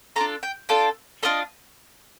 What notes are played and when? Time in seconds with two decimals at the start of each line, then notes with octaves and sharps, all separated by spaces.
0.16 D4 F4 A4 A#5
0.43 G5
0.69 D4 F4 A4 G5
1.23 D4 F4 A4 D#5